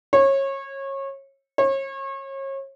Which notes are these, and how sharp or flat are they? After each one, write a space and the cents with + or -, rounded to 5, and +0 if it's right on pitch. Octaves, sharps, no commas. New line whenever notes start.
C#5 -25
C#5 -35